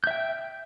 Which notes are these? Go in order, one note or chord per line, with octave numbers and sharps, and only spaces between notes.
E5 G5 G6